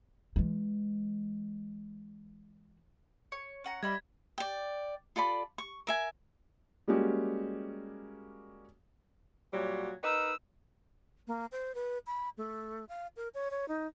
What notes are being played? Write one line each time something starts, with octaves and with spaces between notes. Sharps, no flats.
E3 G#3
C#5
C#4 F#5 A#5
G3 D#5 E5 B5 G#6
D5 G5
F4 A4 D5 B5
C#6
A#4 E5 G#5
G3 G#3 A#3 C#4 F#4 G4
A#2 F#3 G3
D#4 A#4 B4 D#5 E6
A#3
C5
B4
B5
A3
F5
A#4
C#5
C#5
D#4